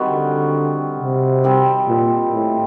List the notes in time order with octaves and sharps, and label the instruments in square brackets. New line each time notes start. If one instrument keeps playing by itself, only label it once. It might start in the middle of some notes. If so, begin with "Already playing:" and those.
Already playing: [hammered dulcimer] D#3 G3 C4 F#4
[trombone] D3
C3
[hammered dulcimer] D#3 G3 C4
[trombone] A#2
A2